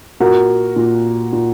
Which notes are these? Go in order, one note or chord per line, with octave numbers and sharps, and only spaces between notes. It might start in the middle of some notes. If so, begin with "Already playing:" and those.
A#2 F#4 A#4
A#2
A#2